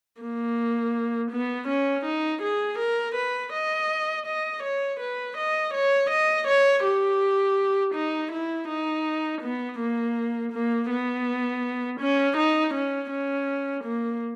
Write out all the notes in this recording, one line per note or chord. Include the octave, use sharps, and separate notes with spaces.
A#3
B3
C#4
D#4
G#4
A#4
B4
D#5
D#5
C#5
B4
D#5
C#5
D#5
C#5
G4
D#4
E4
D#4
B3
A#3
A#3
B3
C#4
D#4
C#4
C#4
A#3